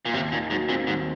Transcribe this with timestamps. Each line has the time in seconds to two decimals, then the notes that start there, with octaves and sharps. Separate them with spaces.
0.05 A#2
0.13 D#2 C3
0.32 A#2 D#3
0.50 G#2 F#3
0.69 A#2 C4
0.87 D#2 G#2